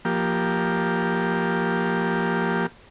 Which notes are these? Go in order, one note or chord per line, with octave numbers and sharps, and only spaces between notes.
F3 A#3 G4